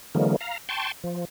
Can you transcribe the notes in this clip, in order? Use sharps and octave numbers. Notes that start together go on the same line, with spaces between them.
D3 E3 F#3 G#3 A#3
F5 A#5
G5 A5 C6 C#6
F3